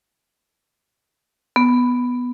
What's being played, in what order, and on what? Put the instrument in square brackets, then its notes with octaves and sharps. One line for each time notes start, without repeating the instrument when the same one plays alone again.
[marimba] B3